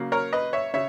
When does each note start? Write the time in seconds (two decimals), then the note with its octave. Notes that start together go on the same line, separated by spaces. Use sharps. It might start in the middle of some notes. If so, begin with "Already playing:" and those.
Already playing: C#3 F#3 A#3
0.12 A#4 C#5
0.33 B4 D#5
0.53 C#5 E5
0.74 C#3 C#5 E5